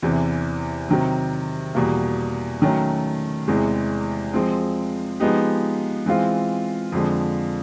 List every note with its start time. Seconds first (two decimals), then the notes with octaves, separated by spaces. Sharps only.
0.02 E2 C3 E3
0.89 C3 D#3 F#3
1.75 E2 B2 G3 A#3
2.62 D#3 F#3 A3 C#4
3.48 E2 C3 E3 G#3
4.34 F3 G#3 C4
5.20 F3 G#3 B3 D#4 G4
6.06 E3 G#3 C4 F4
6.92 F2 D3 F3 G#3